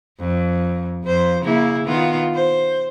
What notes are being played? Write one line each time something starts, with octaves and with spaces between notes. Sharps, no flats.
F2
F2 C5
C#3 A#3 E4
D#3 B3 F4
C5